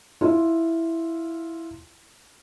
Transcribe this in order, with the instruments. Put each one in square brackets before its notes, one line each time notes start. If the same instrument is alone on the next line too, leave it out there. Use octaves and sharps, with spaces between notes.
[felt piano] E4 F4